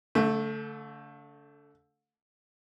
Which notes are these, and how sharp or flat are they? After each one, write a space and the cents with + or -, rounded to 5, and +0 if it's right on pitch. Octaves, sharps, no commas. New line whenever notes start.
D3 -45 A3 +0